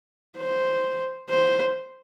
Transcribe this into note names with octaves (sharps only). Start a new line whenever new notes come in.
C5
C5